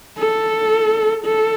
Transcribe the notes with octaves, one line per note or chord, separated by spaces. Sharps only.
A4
A4